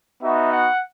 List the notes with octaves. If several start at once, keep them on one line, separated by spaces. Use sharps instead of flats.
B3 D#4 F#4 E5
F#5